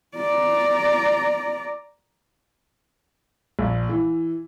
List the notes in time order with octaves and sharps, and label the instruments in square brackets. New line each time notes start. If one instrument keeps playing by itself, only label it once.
[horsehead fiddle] D5 A#5
[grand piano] A#1
E3